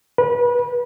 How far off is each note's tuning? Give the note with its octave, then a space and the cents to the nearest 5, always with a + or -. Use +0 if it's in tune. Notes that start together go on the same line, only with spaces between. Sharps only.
B4 -30